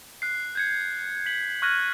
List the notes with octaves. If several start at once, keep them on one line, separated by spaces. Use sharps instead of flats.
F#6 C7
G6 G#6 C#7
B6 F#7
C#6 F6 F#6 G#6 A#6 D#7